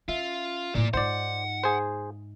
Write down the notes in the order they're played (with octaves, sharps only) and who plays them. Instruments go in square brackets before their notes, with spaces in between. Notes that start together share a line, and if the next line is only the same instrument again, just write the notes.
[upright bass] C#4 [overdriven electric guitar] F4 [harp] E5
[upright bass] A2 E3 [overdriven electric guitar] A#3 D5
[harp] G#2 [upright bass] D#4 F4 [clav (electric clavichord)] C5 D5 [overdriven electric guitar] F#5
[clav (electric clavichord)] G#4 C5